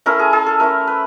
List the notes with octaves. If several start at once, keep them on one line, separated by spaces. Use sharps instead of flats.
A3 C#4 E4 A#4
G#4
G#4
A4
A3 C#4 E4 A#4
B4